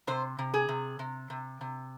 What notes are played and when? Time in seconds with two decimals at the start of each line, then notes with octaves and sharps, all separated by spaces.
0.07 C3 C5
0.39 C3
0.54 G#4
0.69 C3
0.99 C3
1.30 C3
1.61 C3